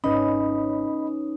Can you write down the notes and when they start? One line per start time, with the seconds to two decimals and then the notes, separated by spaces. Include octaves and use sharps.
0.04 G#1 C#4 D#4 B4 D#5 B5